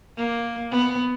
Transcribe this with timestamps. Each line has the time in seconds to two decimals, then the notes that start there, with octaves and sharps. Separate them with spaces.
0.17 A#3
0.72 B3